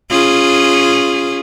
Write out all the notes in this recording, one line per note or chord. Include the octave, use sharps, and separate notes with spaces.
C#4 F4 G#4